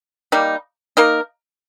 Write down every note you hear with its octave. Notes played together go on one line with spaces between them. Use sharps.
G3 A#3 D#4
A#3 D#4 A#4